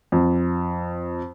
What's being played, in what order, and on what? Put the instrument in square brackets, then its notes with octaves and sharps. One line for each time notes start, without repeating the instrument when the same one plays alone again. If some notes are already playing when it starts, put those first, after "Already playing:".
[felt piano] F2